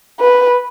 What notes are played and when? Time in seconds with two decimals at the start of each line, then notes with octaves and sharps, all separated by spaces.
0.20 B4